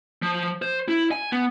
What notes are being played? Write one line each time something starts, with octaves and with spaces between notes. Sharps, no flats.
F3
C5
E4
G#5
B3